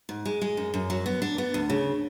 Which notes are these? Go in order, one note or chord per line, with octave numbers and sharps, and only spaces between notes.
G#2
G#3
G#3
F#2
F#2
F#3
B3
D4
B3
D2
C#3